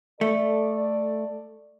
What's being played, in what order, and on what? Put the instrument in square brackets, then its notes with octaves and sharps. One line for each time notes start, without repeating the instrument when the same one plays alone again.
[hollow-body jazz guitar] A3 [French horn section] A4 D5